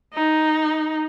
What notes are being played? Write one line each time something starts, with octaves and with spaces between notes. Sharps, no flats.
D#4